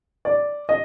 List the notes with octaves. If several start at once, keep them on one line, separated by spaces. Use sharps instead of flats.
D5
D#5